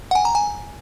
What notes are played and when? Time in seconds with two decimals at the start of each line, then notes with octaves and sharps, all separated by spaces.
0.11 F#5
0.15 G#5
0.25 A#5
0.35 G#5